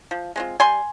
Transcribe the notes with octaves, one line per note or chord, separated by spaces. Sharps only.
F3
G#3 C4 F4
G3 G#5 C6